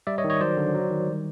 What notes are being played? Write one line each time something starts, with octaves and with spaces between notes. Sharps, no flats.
G3 D5 E5
C#5 D#5
D#3
C#5 D#5
F#3 C5 D5
D3
F#3
D#3
G3